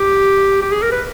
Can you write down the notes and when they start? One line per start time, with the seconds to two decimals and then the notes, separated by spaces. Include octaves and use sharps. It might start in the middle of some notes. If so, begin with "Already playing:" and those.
Already playing: G4
0.62 G4
0.72 G#4
0.82 A#4
0.92 B4